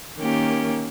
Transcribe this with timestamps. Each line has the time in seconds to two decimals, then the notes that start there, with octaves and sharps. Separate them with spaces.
0.17 D#3 A#3 C#4 G4